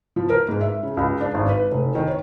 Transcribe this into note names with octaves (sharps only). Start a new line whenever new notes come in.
F3
A#4
G#2
E5
C#3
C#2
D4
G#1
B4
F1
D#3
C#5